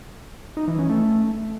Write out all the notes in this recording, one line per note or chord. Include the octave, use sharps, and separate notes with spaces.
D#4
E3
C#4
A3